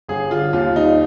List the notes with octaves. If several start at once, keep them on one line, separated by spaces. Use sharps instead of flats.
G1 G#4
D3 F4
D#2 F4
G3 D#4